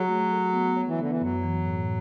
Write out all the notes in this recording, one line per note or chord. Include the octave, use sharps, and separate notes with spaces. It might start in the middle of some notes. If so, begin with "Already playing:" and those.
Already playing: F#3 G#4
A3
A4
B3
C#5
E3
D3 B3
E3
F#2 F#3
E3
A2